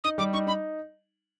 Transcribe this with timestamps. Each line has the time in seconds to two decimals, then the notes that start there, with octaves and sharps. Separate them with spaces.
0.04 D#4 D#6
0.18 G3 D6
0.33 D#4 C#6
0.47 D#4 B5